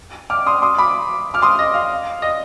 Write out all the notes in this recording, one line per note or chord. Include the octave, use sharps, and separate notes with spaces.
D6 F6
C6 D#6
C6 D#6
B5 D6
D6 F6
C6 D#6
D#5
F5
D#5